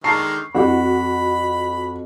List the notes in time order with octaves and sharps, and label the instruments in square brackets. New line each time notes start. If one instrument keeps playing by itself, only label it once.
[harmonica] D3 D#3 G#3 [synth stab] A5 A#5 F6 [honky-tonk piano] C#6 [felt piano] C7
[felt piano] F2 [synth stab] D3 E4 G4 [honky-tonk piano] F#4 [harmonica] B5